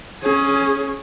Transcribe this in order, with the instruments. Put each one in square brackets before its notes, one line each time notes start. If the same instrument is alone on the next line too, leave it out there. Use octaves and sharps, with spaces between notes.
[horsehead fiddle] C#4 G#4